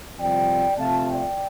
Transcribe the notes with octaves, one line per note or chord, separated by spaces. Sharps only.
F2 C3 G3 F4 D5 G5
C3 F3 A3 F4 F5 A5
D5 G5